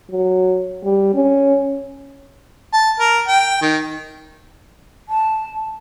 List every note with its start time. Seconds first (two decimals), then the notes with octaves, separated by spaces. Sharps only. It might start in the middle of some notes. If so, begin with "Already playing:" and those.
0.11 F#3
0.84 G3
1.14 C#4
2.73 A5
3.00 A#4
3.27 G5
3.61 D#3
5.09 A5